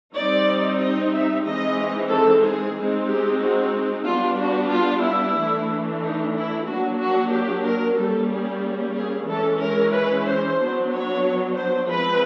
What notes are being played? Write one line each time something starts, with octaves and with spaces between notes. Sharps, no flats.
G3 C4 D#4 D5
D#5
E5
E3 G#3 C4 D#4 D#5
A4
G#4
G#3 C4 D#4
G4
F#4
G3 B3 D4 F4
F#4
F4
E4
E3 A3 D4
D#4
E4
F#3 A#3 D4 F#4
F#4
G4
A#4
G3 A#3 C#4 A4
G#4
G#4
E3 G#3 C#4 A4
A#4
B4
C5
F#3 B3 D4
C#5
C5
F3 G#3 C4 B4